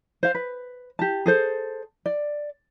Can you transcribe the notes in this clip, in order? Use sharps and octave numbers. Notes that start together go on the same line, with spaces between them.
C5 F5
B4
G4 A5
G#4 A4 C5
D5